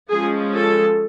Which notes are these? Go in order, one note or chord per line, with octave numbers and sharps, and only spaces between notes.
F3 G#3 C#4 G#4
A4